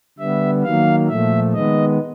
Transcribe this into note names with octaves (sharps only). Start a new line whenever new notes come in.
D3 G3 B3 E5
D#3 F#3 A#3 F5
A#2 F3 A3 E5
D#3 G#3 B3 D#5